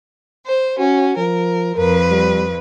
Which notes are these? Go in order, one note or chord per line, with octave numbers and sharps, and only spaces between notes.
C5
C#4 F#4
F3 A#4
F2 A#4 B4
G3